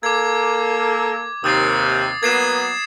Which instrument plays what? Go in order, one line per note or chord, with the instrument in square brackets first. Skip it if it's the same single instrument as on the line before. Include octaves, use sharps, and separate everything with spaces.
[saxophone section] A#3 A4 [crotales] D6 G#6
[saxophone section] D#2 C3 [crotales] D#6 A6 C7
[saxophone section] F#3 A#3 B3 [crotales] G#6 C7 E7